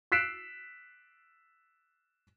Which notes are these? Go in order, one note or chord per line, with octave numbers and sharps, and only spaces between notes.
E6 F#6 B6 C7 D7 E7